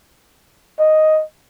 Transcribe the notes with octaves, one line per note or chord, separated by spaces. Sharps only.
D#5